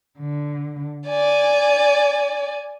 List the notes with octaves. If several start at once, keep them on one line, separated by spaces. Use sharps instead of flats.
D3
D5 G#5